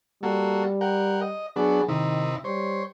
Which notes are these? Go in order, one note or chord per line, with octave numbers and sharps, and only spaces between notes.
G3 A#3 F#4 A4
A#4 F#5 G5
D#5
F#3 B3 D4 G#4
C3 D#3 D#4 E4
G3 C5 C#5